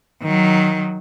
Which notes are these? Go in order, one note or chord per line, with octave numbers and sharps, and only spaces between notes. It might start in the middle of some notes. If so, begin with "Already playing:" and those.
D#3 F#3